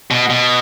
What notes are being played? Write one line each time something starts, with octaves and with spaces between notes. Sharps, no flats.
B2
B2